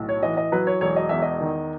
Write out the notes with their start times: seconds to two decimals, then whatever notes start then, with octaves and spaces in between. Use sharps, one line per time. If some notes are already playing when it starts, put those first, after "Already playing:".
Already playing: B1 A2
0.09 C#5
0.23 E3 D#5
0.37 D#5
0.52 F#3 B4
0.67 C#5
0.81 E1 C#5
0.96 D#5
1.09 E2 E5
1.22 D#5
1.40 D#3